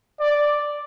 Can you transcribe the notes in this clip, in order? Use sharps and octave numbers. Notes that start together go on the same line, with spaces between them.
D5